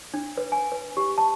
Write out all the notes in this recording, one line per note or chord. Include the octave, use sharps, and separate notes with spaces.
D4
B4
G#5
B4
G4
A5